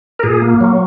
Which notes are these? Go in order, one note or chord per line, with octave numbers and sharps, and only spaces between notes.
A#4
A#2 G#4
A#3
F#3